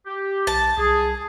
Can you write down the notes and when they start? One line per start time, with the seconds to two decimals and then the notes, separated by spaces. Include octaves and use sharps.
0.06 G4
0.47 B1 A5
0.78 C2 G#4